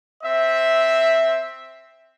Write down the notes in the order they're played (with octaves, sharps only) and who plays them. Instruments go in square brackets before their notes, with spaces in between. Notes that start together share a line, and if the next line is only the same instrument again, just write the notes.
[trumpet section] C4 E5